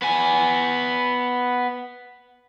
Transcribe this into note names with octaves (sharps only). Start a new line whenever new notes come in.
B3 G#5